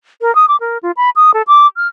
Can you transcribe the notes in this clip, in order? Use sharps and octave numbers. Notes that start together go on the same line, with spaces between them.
A#4
D#6
D6
A#4
F4
B5
D#6
A4
D6
F6